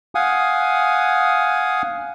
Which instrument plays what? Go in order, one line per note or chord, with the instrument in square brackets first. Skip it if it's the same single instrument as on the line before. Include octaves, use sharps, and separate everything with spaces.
[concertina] F5 F#5 G#5 D#6